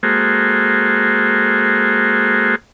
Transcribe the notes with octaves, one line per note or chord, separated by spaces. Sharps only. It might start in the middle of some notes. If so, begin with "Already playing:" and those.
G#3 A#3 F#4 G#4 A4 C5